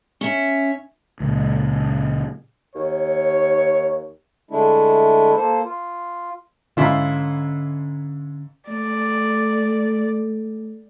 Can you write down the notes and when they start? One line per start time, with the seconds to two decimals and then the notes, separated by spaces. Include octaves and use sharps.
0.21 C#4 E5
1.20 C#2 A#2
2.75 D#2 C#5
4.51 D3 G#3 A3 D4 E4
5.36 A#3 A4 C5
5.65 F4
6.77 G#2 D3 C#4 E4 F4
8.68 A3 D5